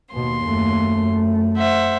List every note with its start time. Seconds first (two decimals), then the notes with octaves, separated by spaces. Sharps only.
0.13 D#2 B2 C6
0.45 F#2 A3
1.56 C5 E5 F#5